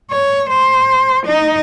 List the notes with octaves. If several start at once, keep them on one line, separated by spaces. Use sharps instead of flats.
C#5
C5
D#4